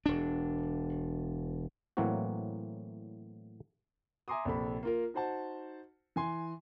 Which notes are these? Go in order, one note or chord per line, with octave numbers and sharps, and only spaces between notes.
E1 D4
A2 E3 F#3 A#3 C4 F#4
E5 G#5 A#5 C6 D6 D#6
A#1 C3 A4 B5
A#3 F4 A#4
D#4 F#4 C5 F#5 A5
E3 G#5 C6